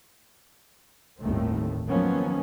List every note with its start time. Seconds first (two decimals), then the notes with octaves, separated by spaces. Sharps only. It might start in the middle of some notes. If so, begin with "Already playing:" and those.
1.22 G1 D#2 A2 D#3 A3 C4
1.89 D#3 F3 F#3 A#3 B3 C#4